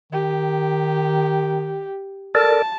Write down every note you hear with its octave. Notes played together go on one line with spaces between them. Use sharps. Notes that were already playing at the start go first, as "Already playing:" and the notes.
D#3 G4
A4 A#4 D5 A5